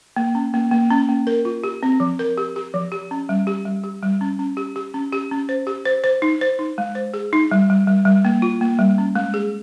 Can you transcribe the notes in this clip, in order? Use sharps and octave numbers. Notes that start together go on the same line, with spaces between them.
A#3
C#4
A#3
A#3
C#4
A#3
A#4
F4
G4
C4
F3
A#4
G4
G4
F3
G4
C#4
G3
G4
G3
G4
G3
C#4
C#4
G4
G4
C#4
G4
C#4
C5
G4
C5
C5
D#4
C5
D#4
G#3
C5
G#4
D#4
G3
G3
G3
G3
A#3
F4
A#3
G3
C#4
G#3
G#4